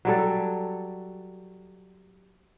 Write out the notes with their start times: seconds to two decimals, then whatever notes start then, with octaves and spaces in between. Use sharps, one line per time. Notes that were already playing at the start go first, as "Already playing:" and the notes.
0.05 F#3 G3 A4